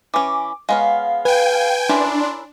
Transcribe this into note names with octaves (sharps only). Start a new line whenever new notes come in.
E3 C#4 D6
G#3 B3 C#5 F5
B4 G5 G#5
C#4 D4 E4 A#4 C6